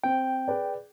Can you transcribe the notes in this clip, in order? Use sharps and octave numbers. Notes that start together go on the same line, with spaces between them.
C4 G5
G#4 B4 D5